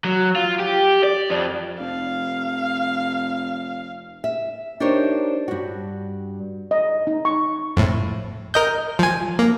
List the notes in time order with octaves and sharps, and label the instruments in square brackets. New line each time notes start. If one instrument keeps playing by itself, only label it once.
[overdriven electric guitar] F#3
F4
G4
D5
F2
[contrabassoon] F1 [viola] F5
[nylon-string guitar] E5
D4 D#4 G4 A#4 C5 C#5
G2 F#4
[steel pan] D#5
D#4
C#6
[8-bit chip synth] F2 A2
A#4 D#5 G6
F3 G#5
A#3